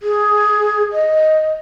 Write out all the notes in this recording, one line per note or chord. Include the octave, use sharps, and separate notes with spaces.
G#4
D#5